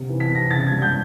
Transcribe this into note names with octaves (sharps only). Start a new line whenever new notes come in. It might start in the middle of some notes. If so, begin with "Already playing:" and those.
Already playing: C3
E3
B6
C3 A#6
C#3 A6
G#6
G3
G6